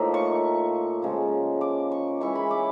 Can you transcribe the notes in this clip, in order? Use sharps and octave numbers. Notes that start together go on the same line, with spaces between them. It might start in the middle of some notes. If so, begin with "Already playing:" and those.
Already playing: A2 F3 A#3 D#4
C#6
C#3 F3 G#3
D6
C#6
E3 G#3 C#4 E4 C#6
B5
D6